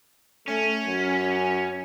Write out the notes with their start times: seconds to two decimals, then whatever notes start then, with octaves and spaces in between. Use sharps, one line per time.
0.48 A3 C#4
0.87 F#2